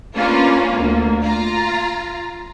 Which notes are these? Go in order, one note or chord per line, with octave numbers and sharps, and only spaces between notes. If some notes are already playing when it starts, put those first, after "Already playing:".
A#3 C#4 D4 F4 B4
D2 A#3
F4 A#5